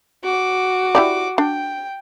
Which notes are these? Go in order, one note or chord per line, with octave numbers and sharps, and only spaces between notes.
F#4 D6
E4 G4 D5
D4 G5